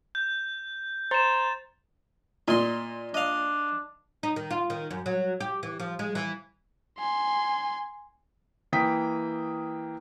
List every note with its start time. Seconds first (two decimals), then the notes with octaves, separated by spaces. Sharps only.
0.15 G6
1.11 C5 A#5 C6 A6 E7
2.48 A#2 D#5 C6
3.14 D4 D#5 F5
4.23 D#4
4.36 D#3
4.51 F4
4.70 D#3
4.91 F#2
5.06 F#3
5.41 G4
5.63 E3
5.80 F3
5.99 G#3
6.15 E3
6.99 G#5 C6
8.73 E3 A#3 G5 D#6 B6